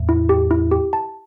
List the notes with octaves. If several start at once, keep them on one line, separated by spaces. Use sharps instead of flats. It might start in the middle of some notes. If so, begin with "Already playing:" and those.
Already playing: E2 A2
E4
G4
E4
G4
A5